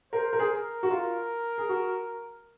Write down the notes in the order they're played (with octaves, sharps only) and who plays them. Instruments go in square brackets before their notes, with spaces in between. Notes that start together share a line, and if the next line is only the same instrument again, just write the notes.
[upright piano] A#4 [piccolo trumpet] C5
[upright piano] A#4
G#4
[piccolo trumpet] A#4
[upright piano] F#4
[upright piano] F4 [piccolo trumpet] A#4
[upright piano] G#4
F#4